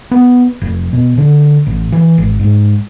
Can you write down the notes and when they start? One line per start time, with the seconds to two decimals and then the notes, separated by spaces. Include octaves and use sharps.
0.11 B3
0.62 F1
0.93 B2
1.18 D3
1.67 A1
1.92 E3
2.18 G#1
2.39 G#2